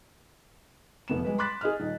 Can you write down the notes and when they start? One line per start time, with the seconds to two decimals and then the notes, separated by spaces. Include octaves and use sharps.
1.08 F1 B3 E7
1.24 G3 G#3 B4
1.38 B5 C6 D6 F#6 A6 B6
1.61 G#4 D#5 F6
1.80 D#1 D#4